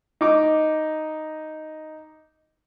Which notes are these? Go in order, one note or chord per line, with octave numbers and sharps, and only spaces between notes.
D#4 D6